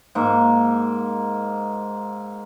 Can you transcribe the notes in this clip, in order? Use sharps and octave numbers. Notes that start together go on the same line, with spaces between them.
G#2 A#3